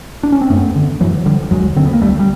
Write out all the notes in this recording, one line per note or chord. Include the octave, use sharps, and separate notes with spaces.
D4
C#4
C4
F#2 A3 B3
D3
F#2 E3 F#3
D3 F3 G3
D#2 F#3 G#3
D3 C4
B3
A#3
C#2 G3 A3
G3